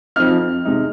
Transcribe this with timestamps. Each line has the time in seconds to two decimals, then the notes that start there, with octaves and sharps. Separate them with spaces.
0.16 F2 F3 C4 D#4 F6
0.65 C3 G#3 D#4